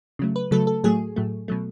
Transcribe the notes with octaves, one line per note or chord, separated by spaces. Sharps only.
C#3 F#3 A3
B4
C#3 F#3 A3 A4
A4
A2 F#3 A3 G#4
A2 F#3 A3
B2 F#3 A3